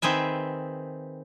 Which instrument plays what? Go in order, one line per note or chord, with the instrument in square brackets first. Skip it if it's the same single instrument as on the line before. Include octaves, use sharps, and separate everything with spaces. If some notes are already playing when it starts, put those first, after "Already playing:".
[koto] D#3 C4 G#4 B4 E5